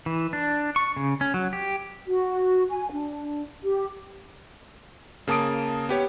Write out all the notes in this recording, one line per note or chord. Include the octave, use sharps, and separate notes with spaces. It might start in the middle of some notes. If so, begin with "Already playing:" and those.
E3
D4
C#6
C#3
C#4
F#3
G4
F#4
G#5
D4
G4
C#3 A#3 A5 D#6 D7
B3 G4 C#5